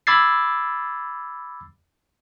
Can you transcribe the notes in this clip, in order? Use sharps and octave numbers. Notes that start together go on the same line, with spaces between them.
B5 D6 E6 G#6 A6 C7